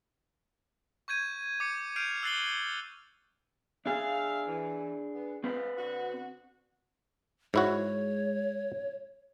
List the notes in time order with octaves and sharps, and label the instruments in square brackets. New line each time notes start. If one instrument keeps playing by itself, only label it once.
[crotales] C#6 G6 G#6 D#7
D6 C#7
F6 G6 C7 D7 D#7 F7
E6 F#6 A6 C7 F#7 G7
[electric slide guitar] D4 G#4 [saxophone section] E5 F5
[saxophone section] E3
B3
[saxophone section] G#3 F4 [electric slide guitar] C4 B4
[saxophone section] D3 D4 F#4
[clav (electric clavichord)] G#2 E4 F#4 [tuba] G#3 [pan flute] C#5